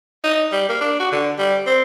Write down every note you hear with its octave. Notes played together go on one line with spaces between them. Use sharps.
D#4
G3
A#3
D4
F#4
D3
G3
C4